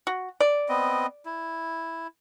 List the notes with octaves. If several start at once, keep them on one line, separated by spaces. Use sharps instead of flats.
F#4
D5
B3 C4 D#5
E4